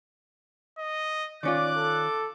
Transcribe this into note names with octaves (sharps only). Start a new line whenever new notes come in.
D#5
D#3 C#4 F4 D5 D6 F#6
A4